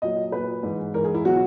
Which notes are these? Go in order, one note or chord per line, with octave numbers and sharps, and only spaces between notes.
A#2 F#3 D#5
A#2 F#3 B4
G#2 E3
G#2 E3 A#4
G#4
E4
B2 F#3 F#4